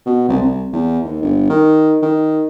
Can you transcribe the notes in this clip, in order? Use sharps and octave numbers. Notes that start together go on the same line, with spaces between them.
B2
C2
C2
E2
D#2
G1
D#3
D#3